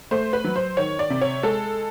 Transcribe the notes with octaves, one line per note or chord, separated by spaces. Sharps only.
A3 C5
B4
F#3
C5
D#3 C#5
D5
C3
C#5
G#3 A4